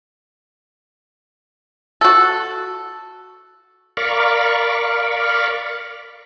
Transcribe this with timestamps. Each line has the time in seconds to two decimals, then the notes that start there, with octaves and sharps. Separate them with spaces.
2.01 F#4 A4
3.97 A#4 D5 F5 B5 C#6